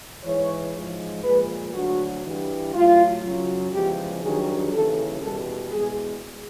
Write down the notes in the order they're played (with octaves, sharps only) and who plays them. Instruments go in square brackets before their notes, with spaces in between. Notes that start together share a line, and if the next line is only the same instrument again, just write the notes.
[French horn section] G#2 E3 G#3 C#5
G#2 F3 G#3
A#2 F3 G#3 B4
D2 D3 F#3 F#4
G2 E3 G3
A2 F#3 F4
F#2 C#3 F#3
E2 C#3 F3 G#3 G4
G2 D#3 F#3 G#4
D#2 C#3 E3 G3 A4
E2 B2 G3 A4
E2 B2 G#3 G#4